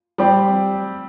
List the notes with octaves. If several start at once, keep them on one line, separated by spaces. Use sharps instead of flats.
G3 C4 G4